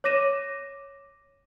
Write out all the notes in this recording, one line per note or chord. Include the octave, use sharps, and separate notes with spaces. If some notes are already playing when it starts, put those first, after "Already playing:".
C#5 D6 A#6 D#7 E7